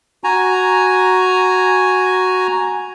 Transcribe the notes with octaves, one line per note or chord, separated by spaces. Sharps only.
F#4 G#5 A#5